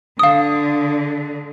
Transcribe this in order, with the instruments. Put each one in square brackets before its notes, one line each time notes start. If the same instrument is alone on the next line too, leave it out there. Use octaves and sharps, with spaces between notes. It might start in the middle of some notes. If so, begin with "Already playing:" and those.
[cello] D3 [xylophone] F5 D#6